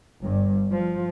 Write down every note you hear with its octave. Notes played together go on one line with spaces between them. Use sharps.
G1 G2
F3